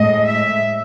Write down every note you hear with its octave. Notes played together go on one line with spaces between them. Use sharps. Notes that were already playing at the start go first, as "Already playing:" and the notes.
Already playing: A2 G#3 D#5
E5